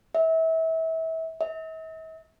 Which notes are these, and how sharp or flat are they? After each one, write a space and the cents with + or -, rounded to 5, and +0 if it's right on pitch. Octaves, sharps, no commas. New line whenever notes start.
E5 -30
E5 -45